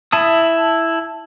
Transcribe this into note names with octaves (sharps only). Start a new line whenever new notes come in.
E4 A5 D#6